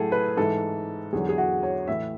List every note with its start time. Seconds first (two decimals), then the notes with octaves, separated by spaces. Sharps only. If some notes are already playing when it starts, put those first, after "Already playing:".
Already playing: A2 F#3 G#4 A4
0.12 B4
0.37 G#2 E3 A4
1.13 E2 D3 F#3 G#4
1.29 G#4
1.38 F#4
1.63 C#5
1.88 A2 E3 E5